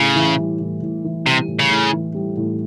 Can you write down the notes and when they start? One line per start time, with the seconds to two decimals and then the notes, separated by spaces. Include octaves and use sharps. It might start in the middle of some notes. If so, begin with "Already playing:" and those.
Already playing: A2 C#3
0.16 E3
0.38 G3
0.60 A2
0.82 A2
1.04 E3
1.26 C3 G3
1.48 A2
1.59 C#3
1.70 A2
1.92 E3
2.14 G3
2.37 A2